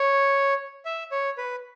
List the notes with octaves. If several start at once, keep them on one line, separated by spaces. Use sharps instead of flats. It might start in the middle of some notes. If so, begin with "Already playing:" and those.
Already playing: C#5
E5
C#5
B4